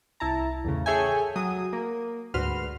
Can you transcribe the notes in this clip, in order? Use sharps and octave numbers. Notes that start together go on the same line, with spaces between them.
C2 E4 A5 A#5
E2 A2 C#3
G#4 A4 C#5 E5 G5 G#5
F#3 D#6
A#3
D2 G#2 F#4 B4 C6 F6